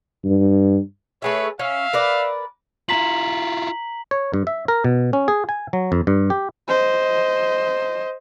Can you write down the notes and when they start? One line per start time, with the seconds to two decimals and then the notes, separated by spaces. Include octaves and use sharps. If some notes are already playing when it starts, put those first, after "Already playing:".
0.25 G2
1.22 A3 G#4 B4 C#5 E5
1.59 C#4 E5 F5
1.93 A#4 B4 D5
2.89 E4 F4 A#5 B6 F#7
4.11 C#5
4.34 G2
4.47 E5
4.68 A#4
4.84 B2
5.13 C#4
5.28 G#4
5.49 G#5
5.73 F#3
5.92 F2
6.07 G2
6.30 G4
6.68 C5 D#5